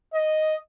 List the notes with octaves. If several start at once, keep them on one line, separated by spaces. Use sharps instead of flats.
D#5